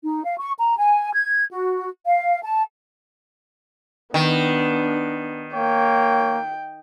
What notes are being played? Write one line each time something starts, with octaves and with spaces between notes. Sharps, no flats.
D#4
F5
C#6
A#5
G#5
G#6
F#4
F5
A5
D#3 B3 D4
A#3 C#5 G5